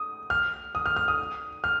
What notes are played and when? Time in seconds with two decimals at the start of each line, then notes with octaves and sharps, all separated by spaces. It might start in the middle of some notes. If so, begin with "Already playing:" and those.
Already playing: D#6
0.30 F6
0.75 D#6
0.86 F6
0.96 F6
1.08 D#6
1.64 F6